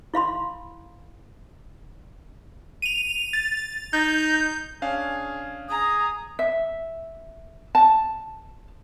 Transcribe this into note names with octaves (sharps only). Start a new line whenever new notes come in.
E4 F5 B5 C6
D#7 F7
A6
D#4 G6
C#4 D4 G#4 F5
G#4 A#5 D#6
E5
A5